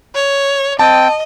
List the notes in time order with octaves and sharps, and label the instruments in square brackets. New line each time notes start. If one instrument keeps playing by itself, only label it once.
[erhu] C#5
[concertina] C4 G5 [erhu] D#5 [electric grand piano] A5